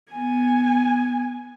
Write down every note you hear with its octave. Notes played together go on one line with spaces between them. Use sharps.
B3 G#5